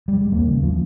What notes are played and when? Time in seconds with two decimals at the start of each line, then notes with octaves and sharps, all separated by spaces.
0.08 G3
0.21 G#3
0.32 D#2 A#3
0.47 C#3
0.63 F3